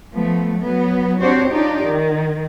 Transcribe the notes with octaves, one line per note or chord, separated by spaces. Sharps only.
F3 A3 B3
F#3 B3
C4 D4 F#4 G4 C5 C#5
D4 D#4 F4 G4 D5
D#3